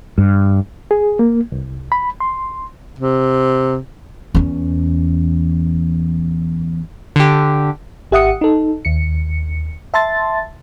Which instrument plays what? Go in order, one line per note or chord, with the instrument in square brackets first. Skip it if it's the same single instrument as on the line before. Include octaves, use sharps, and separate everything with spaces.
[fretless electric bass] G2
[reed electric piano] G#4
A#3
C2
B5
C6
[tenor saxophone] C3
[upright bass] E2 C#4
[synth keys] D3 G4
[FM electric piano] G#1 G4 E5 F#5 D#6 C#7
D#4 A4
D#2 C#7
E5 A5 C6 A6